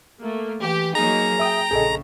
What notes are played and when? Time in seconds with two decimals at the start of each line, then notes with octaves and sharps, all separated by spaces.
0.21 A3 A#3
0.61 E3 G4
0.95 F#3 A#3 D#4 G#4 A#5
1.39 E5 G5 D#6
1.71 A#1 C#3 G#4 A4 D#5